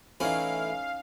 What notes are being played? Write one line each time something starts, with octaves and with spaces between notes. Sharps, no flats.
A2 E3 A3 C#4 D#4 F5